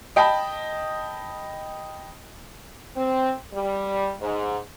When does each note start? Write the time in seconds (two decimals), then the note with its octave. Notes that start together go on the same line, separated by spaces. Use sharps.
0.16 D#5 G5 A5 B5
2.96 C4
3.53 G3
4.21 G#2